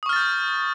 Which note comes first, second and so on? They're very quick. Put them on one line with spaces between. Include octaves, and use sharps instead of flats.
D#6 C#6 F6 A6 G6